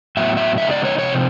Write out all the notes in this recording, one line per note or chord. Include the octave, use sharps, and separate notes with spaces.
A2 F#3 B3 E5
E5
C#3 E3 G#3 B3 D#4 E5
D5
C#5
C3 F3 G#3 C4 C#5